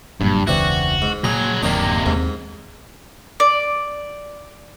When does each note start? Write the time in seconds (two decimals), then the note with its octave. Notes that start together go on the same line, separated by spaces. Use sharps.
0.21 F#1 G2 A#2 F#3
0.47 E1 C#2 E3 C4 D4 F#4
1.02 G#2
1.24 A#2 F#3 G#4 A#5
1.63 D1 F#2 C3 D#3 A#3 D4 D#4
2.06 D#2 G#2 C4
3.40 D5